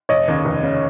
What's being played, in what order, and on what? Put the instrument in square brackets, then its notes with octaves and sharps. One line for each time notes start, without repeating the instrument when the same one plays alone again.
[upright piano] F1 [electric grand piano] C#5 D#5
[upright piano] D#2 C#3
F1
C#3